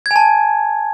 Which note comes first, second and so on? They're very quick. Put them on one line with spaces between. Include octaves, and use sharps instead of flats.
G#6 G#5 A5